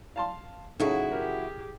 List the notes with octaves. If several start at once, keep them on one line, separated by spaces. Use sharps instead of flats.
F5 A5 C6
F#2 A2 C#3 D#4 E4 F#4 G#4
G4 G#4 A#4